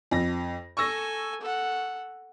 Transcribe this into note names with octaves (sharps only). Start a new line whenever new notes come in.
F2 A#6
A4 G#5 C#6 E6 A#6
A4 F#5